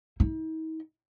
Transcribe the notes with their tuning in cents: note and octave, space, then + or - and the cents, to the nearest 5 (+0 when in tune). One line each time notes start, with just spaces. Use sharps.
D#4 +45